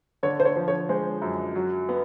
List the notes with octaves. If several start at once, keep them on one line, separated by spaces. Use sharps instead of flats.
D3 C#5
C5
C#5
F3
C#5
G#3 C5
F#2
F#3
B3